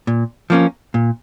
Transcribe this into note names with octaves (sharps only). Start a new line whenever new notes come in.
A#2
F3 A#3 C#4
A#2